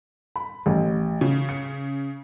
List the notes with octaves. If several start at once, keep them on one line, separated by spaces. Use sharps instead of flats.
B5
A1
C#3
C#7